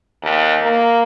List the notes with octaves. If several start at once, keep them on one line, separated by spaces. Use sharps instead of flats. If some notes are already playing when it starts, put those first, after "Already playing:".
D#2
A#3